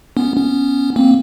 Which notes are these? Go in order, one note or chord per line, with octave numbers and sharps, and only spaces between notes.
B3 C#4
B3 C#4
A#3 C4